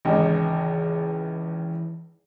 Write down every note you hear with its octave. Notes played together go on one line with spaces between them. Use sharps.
G#1 C#2 E3 D#4